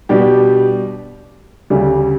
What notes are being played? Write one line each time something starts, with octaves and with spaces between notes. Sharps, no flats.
B2 G3 D4 G4
D2 C#3 G3